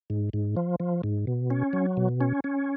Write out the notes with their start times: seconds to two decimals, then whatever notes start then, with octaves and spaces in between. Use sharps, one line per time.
0.10 G#2
0.33 G#2
0.57 F3
0.80 F3
1.03 G#2
1.27 B2
1.51 C#4
1.73 F#3
1.97 B2
2.21 C#4
2.44 C#4